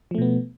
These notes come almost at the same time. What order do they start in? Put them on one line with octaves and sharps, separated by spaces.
F3 A3 B2 B3